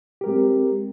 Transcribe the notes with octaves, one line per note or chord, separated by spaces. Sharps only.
G#3 C4 G4 A#4